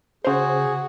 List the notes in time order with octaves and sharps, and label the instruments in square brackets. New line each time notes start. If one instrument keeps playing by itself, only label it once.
[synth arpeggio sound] C#3 C5 [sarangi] F#4 [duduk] G#4